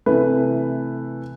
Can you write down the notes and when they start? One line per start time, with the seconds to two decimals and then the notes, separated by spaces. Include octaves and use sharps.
0.06 C3 E3 A3 B4